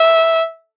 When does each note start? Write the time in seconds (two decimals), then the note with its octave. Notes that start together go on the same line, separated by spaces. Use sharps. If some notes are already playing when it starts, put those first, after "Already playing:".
Already playing: E5